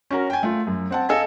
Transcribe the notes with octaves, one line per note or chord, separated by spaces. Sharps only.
C#4 F#4 A#4
G5 G#5
A3 F4
F#2
C4 F#5 A5
A4 D#5 F5 G#5